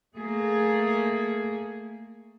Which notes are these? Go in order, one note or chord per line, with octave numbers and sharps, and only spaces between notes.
A3 A#3 G#4